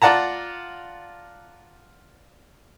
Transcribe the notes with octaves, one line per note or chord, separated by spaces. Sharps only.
F4 D5 F#5 A5 A#5